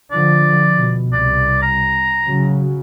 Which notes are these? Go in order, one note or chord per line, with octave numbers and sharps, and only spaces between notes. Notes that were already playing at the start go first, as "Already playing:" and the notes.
D3 F3 D5
B2
C2 D5
A#5
C#3 F#3